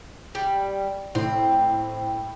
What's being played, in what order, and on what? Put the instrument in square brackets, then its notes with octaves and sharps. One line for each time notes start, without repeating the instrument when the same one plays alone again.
[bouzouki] G3
[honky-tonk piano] A2 [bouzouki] C4